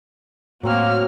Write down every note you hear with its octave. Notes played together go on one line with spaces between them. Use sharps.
A2 F#3 A#3 C4 F#4 C#5 F6